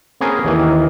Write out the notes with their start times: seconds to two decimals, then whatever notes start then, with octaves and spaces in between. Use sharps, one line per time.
0.21 A#3 C4 C#4 G#4 A#4 B4
0.45 D#2 D#3 E3 A#3